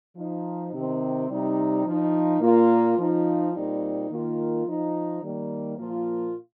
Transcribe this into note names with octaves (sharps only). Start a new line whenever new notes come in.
F3 D#4
C3 D#3 C4
C3 G3 D#4
F3 D#4
A#2 A#3 F4
F3 D#4
A#2 G3 C4 D#4
D#3 A#3 F4
F3 D#4
D#3 G3 A#3
A#2 F3 A#3 F4